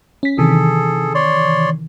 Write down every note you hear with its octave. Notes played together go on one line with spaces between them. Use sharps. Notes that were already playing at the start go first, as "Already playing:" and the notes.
C#4 B6
C3 D#3 E3 G#4 A4
C#5 D5 C6